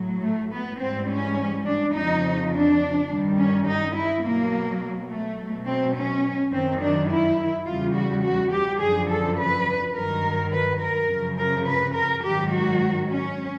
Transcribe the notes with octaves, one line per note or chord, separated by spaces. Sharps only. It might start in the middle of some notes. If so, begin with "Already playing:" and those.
Already playing: A2 F#3
A3
B3
G#2 E3 G3 C4
C#4
D4
F2 C#3 F3 D#4
D4
G2 D#3 G3
C#4
D#4
E4
B2 F#3 A#3
A3
B2 F#3
C4
C#4
F#2 D#3 F#3 C4
D4
E4
E2 C#3 E3 G3 F4
F#4
F#4
G4
F#2 D3 F3 G#4
A4
B4
G2 D#3 F#3 A#4
B4
A#4
F#2 C#3 F3
A#4
B4
A#4
G#2 D#3 F#3 G4
F#4
C#4